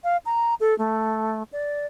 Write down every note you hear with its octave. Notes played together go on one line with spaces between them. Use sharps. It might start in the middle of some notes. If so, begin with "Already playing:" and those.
F5
A#5
A4
A3
D5